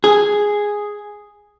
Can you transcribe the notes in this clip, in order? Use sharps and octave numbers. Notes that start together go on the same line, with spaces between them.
G#4